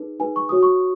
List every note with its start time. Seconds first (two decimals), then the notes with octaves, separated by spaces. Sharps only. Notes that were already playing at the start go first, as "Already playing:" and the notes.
Already playing: D#4 G#4 B4
0.20 D#4 G#4 B4 G#5
0.36 C#6
0.49 F#4 C#5 D#6
0.63 C#6